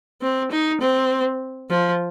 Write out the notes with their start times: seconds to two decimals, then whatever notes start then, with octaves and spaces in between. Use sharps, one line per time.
0.22 C4
0.51 D#4
0.81 C4
1.70 F3